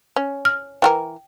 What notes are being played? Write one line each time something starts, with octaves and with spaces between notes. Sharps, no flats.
C#4
F6
E3 F4 A#4 G5